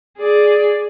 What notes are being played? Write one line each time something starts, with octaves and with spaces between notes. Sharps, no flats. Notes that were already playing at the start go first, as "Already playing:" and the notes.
G#4 D5